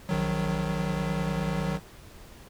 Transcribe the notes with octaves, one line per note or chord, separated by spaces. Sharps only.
A#1 D#3 F#3